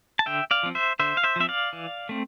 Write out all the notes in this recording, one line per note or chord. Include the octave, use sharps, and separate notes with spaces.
A5
D3 E5 G5
D5 F5
F3 C4
C5 E5
D3 C5 E5
F5
C5 E5
F3 C4 E5
D5 F5
E3
A3 C4